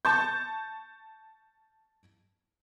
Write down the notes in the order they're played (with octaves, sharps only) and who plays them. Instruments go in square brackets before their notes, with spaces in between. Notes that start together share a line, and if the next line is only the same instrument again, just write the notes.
[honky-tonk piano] A5 C#6 G6